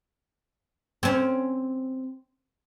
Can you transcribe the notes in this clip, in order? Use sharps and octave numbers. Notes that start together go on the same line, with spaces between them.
C4 C#4